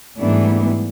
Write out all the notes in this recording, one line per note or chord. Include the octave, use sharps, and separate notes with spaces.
G#2 E3 G3 A3 B3 D4